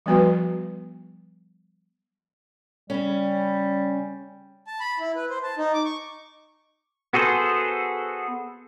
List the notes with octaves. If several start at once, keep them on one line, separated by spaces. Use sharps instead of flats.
F3 G3 B3 F#4 B4
C#3 G3 C#4
A5
B5
E4
B4
C5
A5
D#4
D6
C#6
B3 F#4 G#4 A4 C5